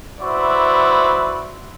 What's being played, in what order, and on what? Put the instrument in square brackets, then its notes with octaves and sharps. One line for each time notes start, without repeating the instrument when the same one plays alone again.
[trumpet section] E4 F#4 B4 C5 D5 E5